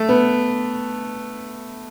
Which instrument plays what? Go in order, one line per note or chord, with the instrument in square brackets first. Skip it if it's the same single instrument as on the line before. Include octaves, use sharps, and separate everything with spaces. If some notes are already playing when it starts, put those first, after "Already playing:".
Already playing: [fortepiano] A3
B3